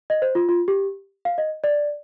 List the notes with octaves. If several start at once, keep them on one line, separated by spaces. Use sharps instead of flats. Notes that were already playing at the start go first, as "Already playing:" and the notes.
D#5
C5
F4
F4
G4
F5
D#5
D5